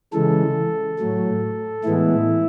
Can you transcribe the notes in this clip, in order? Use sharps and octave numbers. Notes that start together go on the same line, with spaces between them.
C#3 E3 G#3 A4
A2 F#3 A3
A2 E3 G#3 B3 E4